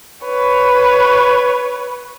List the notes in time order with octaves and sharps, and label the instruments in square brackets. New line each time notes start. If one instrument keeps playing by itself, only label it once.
[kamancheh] B4 C#5